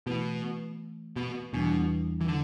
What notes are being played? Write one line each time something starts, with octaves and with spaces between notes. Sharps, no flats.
B2 E3 A3 E4 B4
B2
E2 B2 E3 G3 D4
E3
D3